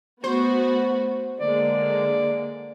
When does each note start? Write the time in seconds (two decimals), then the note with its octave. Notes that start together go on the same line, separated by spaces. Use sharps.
0.24 A3 B3 F#4 C5
1.40 D3 G#3 A#3 D5